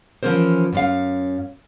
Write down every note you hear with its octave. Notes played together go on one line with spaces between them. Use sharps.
E3 F3 C4 C#4 A#4 C5
F#2 C#4 F5